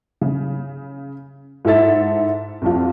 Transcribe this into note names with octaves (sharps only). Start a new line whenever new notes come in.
C#3
G#2 E4 A4 E5 A6
C2 F2 F4